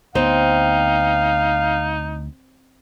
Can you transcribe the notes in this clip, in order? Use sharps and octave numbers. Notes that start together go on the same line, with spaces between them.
D2 B3 C4 D#4 F5